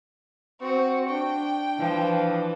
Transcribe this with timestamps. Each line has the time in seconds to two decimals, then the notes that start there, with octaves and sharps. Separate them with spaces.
0.61 C4 F#4
1.09 D4 G5
1.78 E3 F3